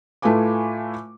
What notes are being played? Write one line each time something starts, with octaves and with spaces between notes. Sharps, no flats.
A2 A3 F4 B4 G#5 D6